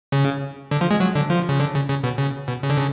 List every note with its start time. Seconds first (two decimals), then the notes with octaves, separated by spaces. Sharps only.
0.12 C#3
0.71 D3
0.81 F3
0.91 G#3
1.00 F#3
1.15 D3
1.30 F3
1.49 C#3
1.60 D3
1.74 C#3
1.89 C#3
2.04 B2
2.18 C#3
2.48 B2
2.63 C#3
2.70 D3
2.77 C#3